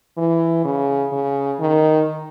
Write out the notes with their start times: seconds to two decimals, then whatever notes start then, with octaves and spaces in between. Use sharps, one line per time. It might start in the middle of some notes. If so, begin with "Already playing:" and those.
0.18 E3
0.65 C#3
1.12 C#3
1.60 D#3